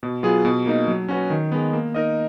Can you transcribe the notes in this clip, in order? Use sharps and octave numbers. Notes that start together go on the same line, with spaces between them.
B2
F#3 B3 F4 G#4
B2
A#3 D#4
F#3
C#4 F#4 B4
D#3
G#3 B3
A#3
D#4 A#4 D#5